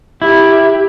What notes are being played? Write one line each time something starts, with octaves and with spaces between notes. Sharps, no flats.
E4 G4